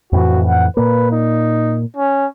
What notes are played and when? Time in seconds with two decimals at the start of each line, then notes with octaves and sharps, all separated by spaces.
0.13 F2 A2 E3 F#4
0.47 F#5
0.77 A#2 A#3 B4
1.12 D#4
1.96 C#4